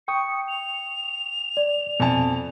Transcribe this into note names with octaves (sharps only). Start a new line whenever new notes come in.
G5 C#6 D#6 C#7
F7
D5
F2 B2 G#5 A5